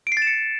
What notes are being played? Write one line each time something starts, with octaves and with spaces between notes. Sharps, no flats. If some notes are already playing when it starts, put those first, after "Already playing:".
D7
C7
A6
E7
C#7